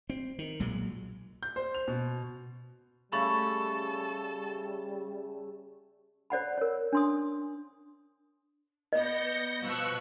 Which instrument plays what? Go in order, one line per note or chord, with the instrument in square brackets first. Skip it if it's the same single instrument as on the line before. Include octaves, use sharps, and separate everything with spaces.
[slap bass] C4
D#3
B1 A#2 F#3 G#3
[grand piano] G6
C5
F7
B2
[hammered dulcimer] C#3 A3 [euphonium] G3 [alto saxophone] A4 [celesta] B5 C#6 A6
[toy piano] C5 D5 F#5 B5
A#4 C#5
D4 C6 D#6
[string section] B3 D5 [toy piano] D#5 [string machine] G6 A#6 C#7
[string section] B2 F3 B3 [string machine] C#6 E6 F#6